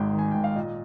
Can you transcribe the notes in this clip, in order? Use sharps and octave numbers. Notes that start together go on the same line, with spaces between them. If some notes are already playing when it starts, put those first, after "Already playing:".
Already playing: G#1 G#2 G5
D#3
G#5
G#1 G5
F5
A#2 D#5